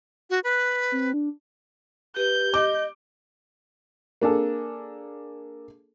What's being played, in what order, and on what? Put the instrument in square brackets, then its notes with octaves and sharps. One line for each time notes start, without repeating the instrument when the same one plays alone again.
[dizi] F#4
[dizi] B4 [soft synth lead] F#6
[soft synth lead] C4
D4
[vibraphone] G4 [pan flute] B4 [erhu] G6
[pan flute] D#5 [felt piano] D6
[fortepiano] A#3 D4 G#4 A4